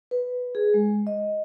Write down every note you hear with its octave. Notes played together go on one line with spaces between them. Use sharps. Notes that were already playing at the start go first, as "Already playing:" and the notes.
B4
G#4
G#3
D#5